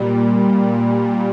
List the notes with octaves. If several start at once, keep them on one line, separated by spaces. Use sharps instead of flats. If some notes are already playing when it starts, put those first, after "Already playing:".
Already playing: A#2 G3